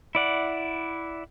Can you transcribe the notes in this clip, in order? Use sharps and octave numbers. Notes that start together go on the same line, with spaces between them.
E4 D5 F#5